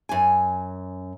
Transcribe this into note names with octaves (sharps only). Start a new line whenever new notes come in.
F#2 G#5